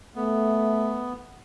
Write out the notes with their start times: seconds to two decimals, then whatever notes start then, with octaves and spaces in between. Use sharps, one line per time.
0.16 A3 B3